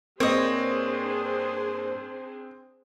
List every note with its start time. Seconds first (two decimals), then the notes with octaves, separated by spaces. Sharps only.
0.20 G2 A#3 C4 D4 G#4 C5 C#5 D#5